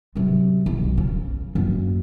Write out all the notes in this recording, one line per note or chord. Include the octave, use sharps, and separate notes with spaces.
C3 F#3
B1
C#3
F#1